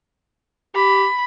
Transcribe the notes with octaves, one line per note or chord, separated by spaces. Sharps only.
G4 B5